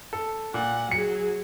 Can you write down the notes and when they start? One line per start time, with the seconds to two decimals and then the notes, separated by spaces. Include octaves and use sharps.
0.13 A4
0.54 A#2 F#5
0.91 F#3 G#4 C#7